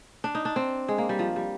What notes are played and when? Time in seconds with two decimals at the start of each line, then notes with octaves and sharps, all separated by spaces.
0.24 D4
0.35 D#4
0.45 D4
0.56 C4
0.88 G#3
0.98 A#3
1.09 G3
1.19 F3
1.36 G3